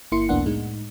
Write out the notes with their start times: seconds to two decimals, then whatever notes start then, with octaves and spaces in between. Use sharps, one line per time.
0.12 G1 A#3 E4 C6 C#7
0.29 C2 F2 A#3 B3 D4 F#5
0.46 A2 G#3 D#4